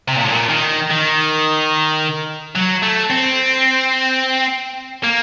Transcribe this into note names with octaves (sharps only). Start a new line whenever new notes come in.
C3
A#2
A2
A#2
D#3
D#3
F#3
A3
C4
A#3